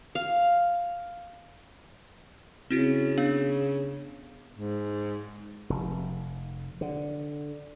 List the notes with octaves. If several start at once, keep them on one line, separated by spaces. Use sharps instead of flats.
F5
C#3 C4 E4 F#4
B3 D4 F5
G#2
F1
D3